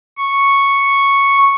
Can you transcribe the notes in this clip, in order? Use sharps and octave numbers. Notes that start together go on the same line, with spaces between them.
C#6